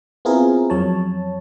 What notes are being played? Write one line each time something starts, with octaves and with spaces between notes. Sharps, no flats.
B3 C4 E4 F4 G#4 A#4
F2 F#3 C#5 A5